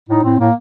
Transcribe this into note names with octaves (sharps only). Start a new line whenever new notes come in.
A2 D#4
A2 C4
A2 A#3